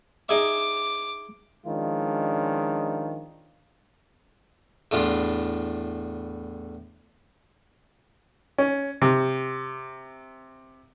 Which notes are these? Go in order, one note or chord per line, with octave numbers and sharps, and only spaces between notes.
D#4 G#4 E5 D6
D#3 F3 G#3 C#4 D4 F4
E2 A2 D4 F4
C#4
C3